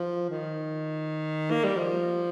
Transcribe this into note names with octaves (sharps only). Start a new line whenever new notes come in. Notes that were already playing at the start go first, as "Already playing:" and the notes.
Already playing: F3
D#3
A#3
G3
F3